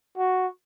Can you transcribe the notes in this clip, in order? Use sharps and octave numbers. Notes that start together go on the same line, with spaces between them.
F#4